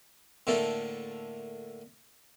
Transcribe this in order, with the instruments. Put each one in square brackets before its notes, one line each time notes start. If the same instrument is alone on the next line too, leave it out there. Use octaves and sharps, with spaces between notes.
[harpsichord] A2 D3 A3 A#3 A4